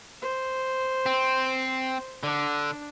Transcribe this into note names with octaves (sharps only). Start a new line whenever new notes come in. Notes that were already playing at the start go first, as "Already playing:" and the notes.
C5
C4
D3 D4